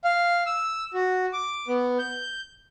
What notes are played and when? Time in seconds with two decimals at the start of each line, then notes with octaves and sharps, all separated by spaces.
0.04 F5
0.46 E6
0.94 F#4
1.33 D6
1.68 B3
1.99 G6